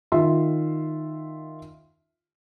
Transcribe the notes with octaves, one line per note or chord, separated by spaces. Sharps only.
D#3 F4 E5 C6